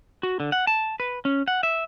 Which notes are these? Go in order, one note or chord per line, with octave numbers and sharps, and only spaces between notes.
F#4
D3
F#5
A5
B4
C#4
F#5
E5